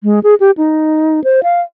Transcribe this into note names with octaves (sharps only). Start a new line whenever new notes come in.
G#3
G#4
G4
D#4
C5
F5